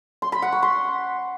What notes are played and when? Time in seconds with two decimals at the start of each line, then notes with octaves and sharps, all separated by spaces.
0.22 C6
0.32 B5
0.42 F#5
0.52 C#6
0.63 C6